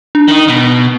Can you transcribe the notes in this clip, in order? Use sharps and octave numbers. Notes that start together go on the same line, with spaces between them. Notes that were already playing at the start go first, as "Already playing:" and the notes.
D4
D#3 D#4
B2